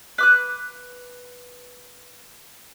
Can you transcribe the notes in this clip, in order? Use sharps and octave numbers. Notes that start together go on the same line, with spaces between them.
B4 D6 F#6